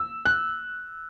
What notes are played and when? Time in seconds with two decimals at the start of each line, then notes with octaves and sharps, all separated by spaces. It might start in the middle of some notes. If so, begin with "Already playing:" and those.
Already playing: E6
0.25 F#6